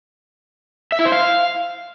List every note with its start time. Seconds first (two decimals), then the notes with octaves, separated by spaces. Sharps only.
0.92 E5
0.99 E4
1.05 C5
1.12 F5